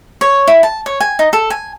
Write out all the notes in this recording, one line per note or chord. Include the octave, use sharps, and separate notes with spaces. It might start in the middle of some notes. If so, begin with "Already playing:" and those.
C#5
E4
A5
C#5
G#5
D#4
A4
G#5